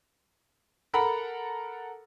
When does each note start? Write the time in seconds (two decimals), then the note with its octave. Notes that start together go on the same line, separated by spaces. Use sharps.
0.94 A4 A#4 F#5 A#5 B5